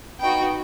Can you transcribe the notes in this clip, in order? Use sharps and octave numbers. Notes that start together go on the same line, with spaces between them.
B3 D#4 F#4 G5